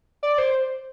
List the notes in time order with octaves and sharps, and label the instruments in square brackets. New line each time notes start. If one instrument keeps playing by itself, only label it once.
[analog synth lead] D5
C5